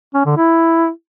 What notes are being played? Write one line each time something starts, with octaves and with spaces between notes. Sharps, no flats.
C#4
D3
E4